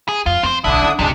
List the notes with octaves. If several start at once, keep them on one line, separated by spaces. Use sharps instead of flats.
G#4
F2 F4
F2 C4 C5
D1 B1 D3 D4 E4 D#6
A#3 C#4
G1 D2 C3 G#3 D4